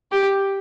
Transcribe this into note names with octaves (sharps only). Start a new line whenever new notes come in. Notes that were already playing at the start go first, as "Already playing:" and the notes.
G4